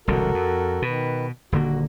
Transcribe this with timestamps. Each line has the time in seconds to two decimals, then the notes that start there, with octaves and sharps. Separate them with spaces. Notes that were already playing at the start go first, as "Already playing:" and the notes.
0.08 E1 C2 D3 F#4 A4 A#4
0.34 F2
0.82 B2 D#3 B4
1.52 D#1 D3 A#3 F#4